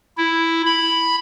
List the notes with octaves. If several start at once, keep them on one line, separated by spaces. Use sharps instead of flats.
E4
B5